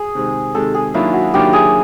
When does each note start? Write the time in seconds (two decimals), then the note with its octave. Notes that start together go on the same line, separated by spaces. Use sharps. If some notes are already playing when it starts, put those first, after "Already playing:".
Already playing: G#4
0.15 C3 D#3 G#3 C4
0.55 C3 D#3 G#3 C4 A4
0.74 G#4
0.94 D#3 F#3 A#3 D4 E4 F4
1.13 F#4
1.34 D#3 F#3 A#3 D4 F4 G4
1.53 G#4